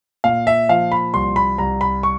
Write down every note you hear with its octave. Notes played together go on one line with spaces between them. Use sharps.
A#2 F5
E5
F3 F5
B5
C2 C6
B5
C2 A#5
B5
C#6